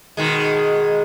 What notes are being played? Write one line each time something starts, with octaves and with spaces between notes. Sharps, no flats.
B2 D#3 G#3